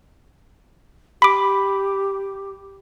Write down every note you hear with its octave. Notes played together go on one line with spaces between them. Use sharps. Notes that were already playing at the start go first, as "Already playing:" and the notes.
G4 B5 D6